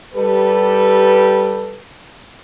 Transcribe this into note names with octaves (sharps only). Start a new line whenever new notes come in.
G3 G4 A4 B4